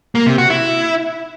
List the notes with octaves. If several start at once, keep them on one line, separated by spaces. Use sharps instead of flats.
A#3
C3
F#4
E4